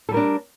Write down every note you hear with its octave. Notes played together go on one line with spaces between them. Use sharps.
G3 D4 A4 A#4